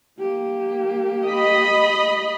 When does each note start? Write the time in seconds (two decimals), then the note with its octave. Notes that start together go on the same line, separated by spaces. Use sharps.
0.19 A#3 G4
1.26 D#5 B5